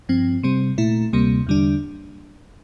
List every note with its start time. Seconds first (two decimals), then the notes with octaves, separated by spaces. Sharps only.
0.09 G2 F3 C4
0.43 C3 G3 C4
0.78 A#2 A3 E4
1.13 D2 C3 G3 A#3
1.47 E2 D3 G3 D4